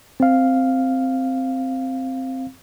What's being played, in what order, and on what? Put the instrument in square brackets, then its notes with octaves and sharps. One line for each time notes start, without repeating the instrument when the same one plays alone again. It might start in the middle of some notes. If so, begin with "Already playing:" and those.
[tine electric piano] C4 F5